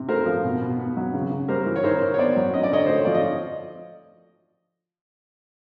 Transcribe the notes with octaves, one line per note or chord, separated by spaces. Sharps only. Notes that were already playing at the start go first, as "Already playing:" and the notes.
Already playing: C3
A3 A#4 C5
F3
B2
B2
B3
F#3
C#3
C#3
G3 A#4 C5
E3
C#5
D#3 A#4 C5
D#3
C#5
B3 C5 D5
F#3
C#4 D#5
D5
D3 C#5 D#5
A3 C5
C#5
F3 D5
D#5